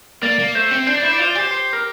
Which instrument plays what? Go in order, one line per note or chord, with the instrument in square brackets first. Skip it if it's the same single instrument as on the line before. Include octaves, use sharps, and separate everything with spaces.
[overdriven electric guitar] A#3 [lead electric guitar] D5
[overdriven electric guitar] A#3
[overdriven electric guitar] A3 [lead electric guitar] C5
[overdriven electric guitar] C4
[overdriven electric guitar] D4 [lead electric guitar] C5
[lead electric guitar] D5
[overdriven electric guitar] E4 [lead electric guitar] C5
[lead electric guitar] D5
[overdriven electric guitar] F4 [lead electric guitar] C5
[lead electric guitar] D5
[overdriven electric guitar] G4 [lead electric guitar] C5
[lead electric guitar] C5
A#4